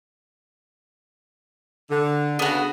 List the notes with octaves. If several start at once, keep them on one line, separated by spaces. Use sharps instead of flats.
D3
C#3 B3 D4 F#4